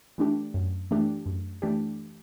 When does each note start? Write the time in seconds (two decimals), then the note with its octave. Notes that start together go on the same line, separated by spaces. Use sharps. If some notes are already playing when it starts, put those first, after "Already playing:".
0.18 E3 A3 D4 G4
0.54 F#2
0.91 E3 A3 D4 G4
1.26 F#2
1.62 E3 A3 D4 G4